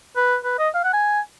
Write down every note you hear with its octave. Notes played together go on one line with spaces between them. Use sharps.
B4
B4
D#5
F5
F#5
G#5